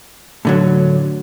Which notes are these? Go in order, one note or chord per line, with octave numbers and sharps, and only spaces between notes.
A2 D3 F#3